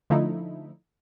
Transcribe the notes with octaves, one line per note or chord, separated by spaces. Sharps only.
D3 F3 A3 D#4 E4